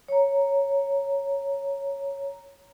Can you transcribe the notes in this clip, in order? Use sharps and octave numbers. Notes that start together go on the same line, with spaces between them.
C#5 A#5